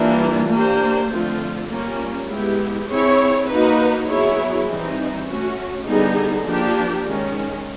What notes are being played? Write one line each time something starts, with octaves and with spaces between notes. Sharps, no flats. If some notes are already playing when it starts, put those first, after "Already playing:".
Already playing: E3 G3 A#3 D4 F4
A#3 D4 G4 C5
D3 F3 A3 C4 F4
G3 A#3 C#4 F4
G#3 B3 E4 G4
C4 E4 G#4 C#5
A#3 D#4 F#4 B4
F#3 B3 E4 G#4 C#5
E3 G3 C4 D#4
A3 C#4 F#4
D3 G3 B3 D#4 G#4
F3 A#3 D4 G4
D#3 G#3 C#4